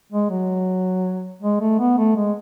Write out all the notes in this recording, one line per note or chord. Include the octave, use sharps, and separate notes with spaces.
G#3
F#3
G#3
A3
B3
A3
G#3